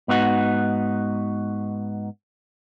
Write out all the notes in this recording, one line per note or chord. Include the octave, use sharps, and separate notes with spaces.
G#2 B3 D#4 F#4